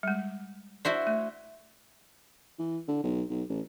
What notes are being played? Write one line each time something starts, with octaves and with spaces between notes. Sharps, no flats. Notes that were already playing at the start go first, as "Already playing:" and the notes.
G3 G#3
E4 F#4 C5 D5
A3
E3
D3
B1
B1
A1